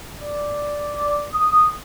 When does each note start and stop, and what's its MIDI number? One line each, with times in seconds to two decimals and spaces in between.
0.19 1.27 74
1.33 1.70 87